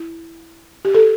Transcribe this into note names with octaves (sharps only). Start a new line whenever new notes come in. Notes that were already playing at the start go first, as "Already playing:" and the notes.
Already playing: E4
G4
A4